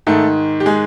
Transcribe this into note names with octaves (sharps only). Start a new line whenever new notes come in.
G#2 D#3 A3 A4
G4
G#3 G#4